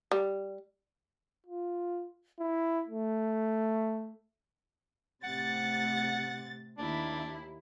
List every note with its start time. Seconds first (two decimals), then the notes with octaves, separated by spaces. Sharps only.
0.11 G3
1.46 F4
2.39 E4
2.88 A3
5.24 A2 C3 F#5 A6
6.78 D#2 D4 E4